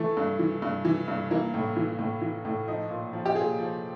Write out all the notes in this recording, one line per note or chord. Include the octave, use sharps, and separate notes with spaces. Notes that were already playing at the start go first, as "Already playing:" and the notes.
Already playing: E3 A3
G2
E3
G2
E3
G2
E3 A#3
A2
E3
A2
E3
A2
F3 D#4
A#2
F3
G4
A#2 G#4
F3